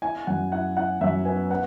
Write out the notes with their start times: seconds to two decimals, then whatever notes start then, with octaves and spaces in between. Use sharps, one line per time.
0.02 E4 G#5
0.27 F#2 F#5
0.52 E4 F#5
0.76 E4 F#5
1.01 F#2 E5
1.25 B3 G#5
1.50 B3 F#5